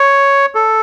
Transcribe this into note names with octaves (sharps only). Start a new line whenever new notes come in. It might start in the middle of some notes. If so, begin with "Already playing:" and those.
Already playing: C#5
A4